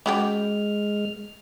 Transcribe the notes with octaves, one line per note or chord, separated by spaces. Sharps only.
G#3 C#4 F#4 G4 F6